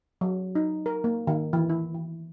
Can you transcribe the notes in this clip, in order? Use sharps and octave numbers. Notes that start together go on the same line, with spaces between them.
F#3
D#4
A#4
A#3
D#3
E3
E4
E3